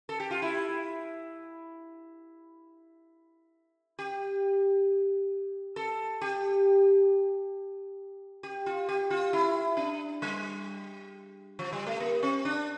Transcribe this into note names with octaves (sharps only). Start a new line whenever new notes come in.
A4
G4
F4
E4
G4
A4
G4
G4
F4
G4
F4
E4
D4
G3
F3
G3
A3
A#3
C4
D4